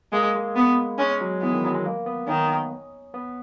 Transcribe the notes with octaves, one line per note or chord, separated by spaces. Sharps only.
G#3 A#3
G#3
B3
G#3 C#4
F#3
E3 B3
D#3
F#3
G#3
A#3
B3
D#3 C#4
B3